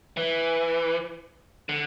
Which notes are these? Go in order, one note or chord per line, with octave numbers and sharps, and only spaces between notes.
E3
D3